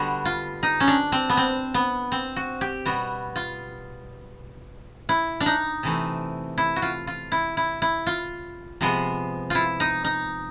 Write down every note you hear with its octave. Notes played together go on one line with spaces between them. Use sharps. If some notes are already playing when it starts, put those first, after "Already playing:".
Already playing: D3 G3 B3 F#4
F4
D#4
C#4
D4
C4
B3
C4
B3
C4
F#4
G4
B2 G3 B3 F#4
F4
E4
D4
D#4
C3 E3 A3
E4
F#4
F4
F4
E4
E4
E4
F4
C3 F3 G#3 B3
E4 F4
D#4
D#4